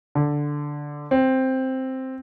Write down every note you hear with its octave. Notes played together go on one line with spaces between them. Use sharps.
D3
C4